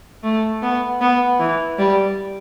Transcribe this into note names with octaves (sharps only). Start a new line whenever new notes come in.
A3
B3
B3
E3
G3